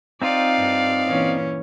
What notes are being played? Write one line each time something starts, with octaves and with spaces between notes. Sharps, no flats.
C4 D#4 F4 D5 F5
G2
A#2 E3 C#4